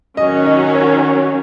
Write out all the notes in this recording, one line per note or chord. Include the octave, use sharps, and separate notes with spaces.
D#3 F#3 C#4 D#5
D#5
C#5